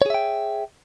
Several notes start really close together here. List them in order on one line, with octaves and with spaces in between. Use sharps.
C#5 G#4 E5 G5